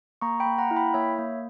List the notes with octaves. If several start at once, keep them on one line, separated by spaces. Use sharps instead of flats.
A#3 A#5 C#6
G5 B5
A#3
F#5 A#5
E4
G5 B5
A#3 C#5 E5
A#3